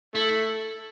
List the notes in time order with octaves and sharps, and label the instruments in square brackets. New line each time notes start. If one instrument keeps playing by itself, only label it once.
[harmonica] A3 [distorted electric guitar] E4